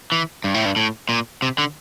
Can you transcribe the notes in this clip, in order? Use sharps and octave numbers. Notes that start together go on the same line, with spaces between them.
E3
G2
A2
G2
A2
A#2
C3
D3